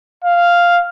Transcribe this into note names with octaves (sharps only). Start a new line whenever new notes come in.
F5